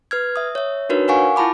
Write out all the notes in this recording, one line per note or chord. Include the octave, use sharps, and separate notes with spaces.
B4 F6 G#6
E5 D#6
C#5 E5
D4 D#4 F#4 A#4 B4 C#5
A#4 F5 F#5 G#5 C#6
E4 F4 A5 B5 D6